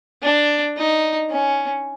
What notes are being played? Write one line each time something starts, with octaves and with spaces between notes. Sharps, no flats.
D4
D#4
C#4